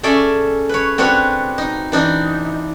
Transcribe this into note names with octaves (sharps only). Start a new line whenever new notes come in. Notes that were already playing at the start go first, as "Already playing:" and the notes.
C#4 G#4 A4 D5 E5
B4 C#5
C4 D4 F#4 B4 C#5
D#4
E3 D4 D#4